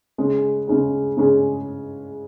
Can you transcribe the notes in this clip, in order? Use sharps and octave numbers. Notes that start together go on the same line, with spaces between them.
C#3 G#3 C#4 G#4
C#3 G#3 C#4 G#4
C#3 G#3 C#4 G#4